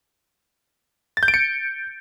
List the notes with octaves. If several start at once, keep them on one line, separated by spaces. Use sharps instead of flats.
A6
G6
D7
C#7